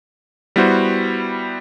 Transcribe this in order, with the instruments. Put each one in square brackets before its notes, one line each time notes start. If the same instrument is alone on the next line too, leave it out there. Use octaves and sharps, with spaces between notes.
[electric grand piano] G3 B3 E4 F#4 C5